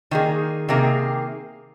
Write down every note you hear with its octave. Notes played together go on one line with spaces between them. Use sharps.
D#3 A#3 G#4
C3 D#3 A#3 G#4